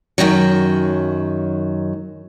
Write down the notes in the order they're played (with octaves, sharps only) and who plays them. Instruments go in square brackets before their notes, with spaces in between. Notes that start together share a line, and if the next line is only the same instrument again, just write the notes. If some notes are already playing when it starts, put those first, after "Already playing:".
[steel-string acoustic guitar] F#2 B2 D#3 F#3